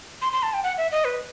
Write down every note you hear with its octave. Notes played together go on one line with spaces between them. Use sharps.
C6
C6
A5
G5
F#5
E5
D#5
B4